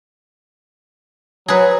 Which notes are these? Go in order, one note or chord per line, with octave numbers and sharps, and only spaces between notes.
F#3 G#4 B4